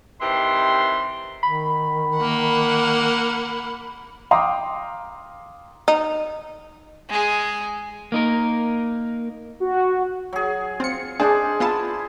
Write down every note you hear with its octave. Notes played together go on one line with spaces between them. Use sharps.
C3 D#3 E3 G4 C6
D#3 B5
A#3 F#5
F5 G5 A#5 C6 D6 D#6
D#4
G#3 G#4
A#3 D#4 A#4
F#4
F#3 G#4
C4 F4 C#7
G#3 D4 G#4 C5 D5
B3 E4 F4 A5